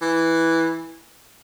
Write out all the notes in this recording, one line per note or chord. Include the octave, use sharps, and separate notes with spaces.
E3